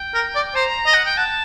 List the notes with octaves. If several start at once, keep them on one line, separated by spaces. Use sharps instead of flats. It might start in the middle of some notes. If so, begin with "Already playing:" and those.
Already playing: G5
A#4
D5
C5 A#5
D#5
F#5
G5
F#5 A5